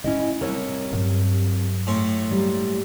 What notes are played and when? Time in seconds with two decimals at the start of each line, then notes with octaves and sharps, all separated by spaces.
0.04 A2 C#4 E4 D#5
0.41 C2 A#4 C#5
0.91 G2 F#3
1.87 A2 C#4 C6
2.31 G3 A#3